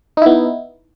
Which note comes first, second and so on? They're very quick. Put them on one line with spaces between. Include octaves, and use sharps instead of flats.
D#4 E4 B3